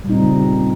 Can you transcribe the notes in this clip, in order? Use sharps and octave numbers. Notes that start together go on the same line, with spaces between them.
A#2 C#3 G3 C4 D#4